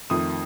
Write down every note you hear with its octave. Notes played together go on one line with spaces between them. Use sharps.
F2 D#3 A3 D#6